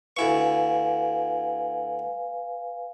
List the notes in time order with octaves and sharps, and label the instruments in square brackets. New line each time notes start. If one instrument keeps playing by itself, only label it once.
[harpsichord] D2 E4 C#6 [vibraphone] B4 F5 G#5